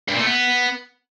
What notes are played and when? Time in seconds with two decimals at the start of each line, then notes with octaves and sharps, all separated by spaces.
0.08 G2
0.14 A#2
0.20 A3
0.26 B3